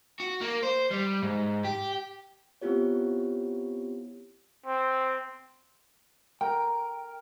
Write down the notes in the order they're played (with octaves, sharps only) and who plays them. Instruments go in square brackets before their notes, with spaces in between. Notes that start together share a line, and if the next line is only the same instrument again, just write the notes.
[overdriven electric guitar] F#4
A#3
C5
G3
G#2
G4
[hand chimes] B3 C4 E4 F4 G4 C#5
[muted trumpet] C4
[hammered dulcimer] A#4 [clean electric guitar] G5